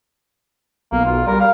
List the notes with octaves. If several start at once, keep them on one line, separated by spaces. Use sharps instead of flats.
B1 A#3
F4
G3 A#4
F5